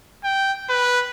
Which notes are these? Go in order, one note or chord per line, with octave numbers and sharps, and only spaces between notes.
G5
B4